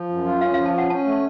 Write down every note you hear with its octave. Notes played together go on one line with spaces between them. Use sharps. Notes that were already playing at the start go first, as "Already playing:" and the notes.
Already playing: F3
F#2
F4
C#4 F5
F3 F5
A5
C#4 F#5
C#4 A5
A3